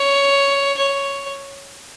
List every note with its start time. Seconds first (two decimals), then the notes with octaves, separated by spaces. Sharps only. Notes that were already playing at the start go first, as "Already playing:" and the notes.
Already playing: C#5
0.77 C#5